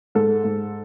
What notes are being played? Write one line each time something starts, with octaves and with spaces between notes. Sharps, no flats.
G#2 A4
G#2